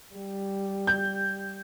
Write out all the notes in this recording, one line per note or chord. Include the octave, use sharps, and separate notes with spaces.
G3
G6